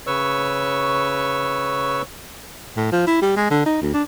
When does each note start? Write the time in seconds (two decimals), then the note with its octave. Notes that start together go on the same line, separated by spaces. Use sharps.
0.07 C#3 B4 C#5 C#6 E6
2.77 A2
2.92 F3
3.07 E4
3.22 G3
3.36 G#3
3.51 D3
3.66 D#4
3.82 D2
3.94 D4